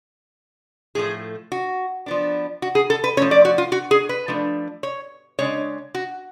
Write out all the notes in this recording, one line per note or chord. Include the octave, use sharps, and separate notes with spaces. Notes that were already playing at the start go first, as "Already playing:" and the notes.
A2 F3 A3 G#4
F#4
F3 B3 D4
F#4
G#4
A4
B4
F3 A3 C#4 C#5
D5
F#4
F4
F#4
G#4
B4
F3 A3 D4
C#5
C#3 G#3 D4 C#5
F#4